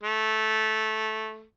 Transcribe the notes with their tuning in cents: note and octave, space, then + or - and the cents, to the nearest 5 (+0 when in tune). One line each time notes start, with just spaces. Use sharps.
A3 -10